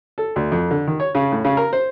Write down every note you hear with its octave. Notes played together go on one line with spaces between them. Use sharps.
A4
D2
F2
D3
D#3
C#5
C#3
A2
C#3
A#4
C5